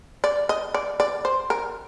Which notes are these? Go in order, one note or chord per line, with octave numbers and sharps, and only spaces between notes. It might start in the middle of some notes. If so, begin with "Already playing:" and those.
D5
D#5
D5
D5
C5
A#4